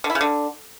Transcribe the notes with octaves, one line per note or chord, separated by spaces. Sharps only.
D3
E4
C#3
D3